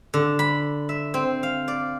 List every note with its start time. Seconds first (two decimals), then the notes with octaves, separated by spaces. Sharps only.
0.14 D3
0.39 B5
0.89 E5
1.14 C4
1.43 F5
1.68 D5